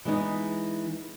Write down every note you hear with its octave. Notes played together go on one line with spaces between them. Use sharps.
E3 G#3 B3 D#4